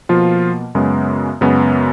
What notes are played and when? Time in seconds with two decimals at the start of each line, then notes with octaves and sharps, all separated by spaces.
0.09 B2 F3 A#3 F4
0.75 F#2 C#3 G#3 B3
1.41 F#2 C#3 G#3 B3